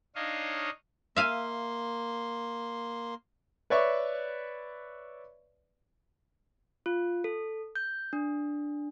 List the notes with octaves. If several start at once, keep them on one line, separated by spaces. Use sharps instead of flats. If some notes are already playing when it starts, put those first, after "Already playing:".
D4 D#4 C#5 D#5 F5
A#3 E5 F5 G#5 C6
B4 C#5 D5 E5 C#6
F4
A4
G6
D4